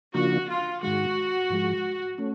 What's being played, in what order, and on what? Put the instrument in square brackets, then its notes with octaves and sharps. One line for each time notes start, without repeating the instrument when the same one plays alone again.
[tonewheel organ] C#3 F3 A#3 D4 F4 [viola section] F#4
[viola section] F4
[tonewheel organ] G#2 D#3 G#3 [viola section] F#4
[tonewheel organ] G#2 F3 G#3
A3 C#4